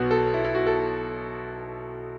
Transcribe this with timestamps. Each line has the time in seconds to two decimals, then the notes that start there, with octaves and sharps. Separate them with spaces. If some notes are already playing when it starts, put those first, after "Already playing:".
Already playing: B1 B2 B3 F#4
0.11 A4
0.34 E4
0.44 E4
0.55 F#4
0.67 A4